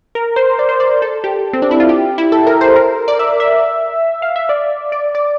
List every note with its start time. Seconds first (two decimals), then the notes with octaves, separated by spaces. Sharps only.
0.15 A#4
0.36 C5
0.59 D5
0.69 C5
0.80 D5
1.02 A4
1.24 G4
1.53 C4
1.62 D4
1.71 E4
1.80 F4
1.89 G4
2.18 E4
2.32 A4
2.47 A#4
2.61 C5
2.76 A#4
3.08 D5
3.19 E5
3.40 E5
4.22 F5
4.36 E5
4.49 D5
4.92 D5
5.15 D5